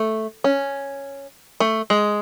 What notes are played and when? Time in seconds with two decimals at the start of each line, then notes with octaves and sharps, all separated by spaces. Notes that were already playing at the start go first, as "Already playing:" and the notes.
Already playing: A3
0.44 C#4
1.60 A3
1.90 G#3